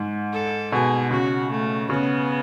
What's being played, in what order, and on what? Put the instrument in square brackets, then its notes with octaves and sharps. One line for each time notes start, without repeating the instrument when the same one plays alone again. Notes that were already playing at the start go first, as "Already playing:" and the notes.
Already playing: [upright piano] G#2
[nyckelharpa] A4
[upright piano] B2 [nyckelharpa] G#4
[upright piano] C#3 [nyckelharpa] F#4
[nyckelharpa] A3
[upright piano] C#3 [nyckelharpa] B3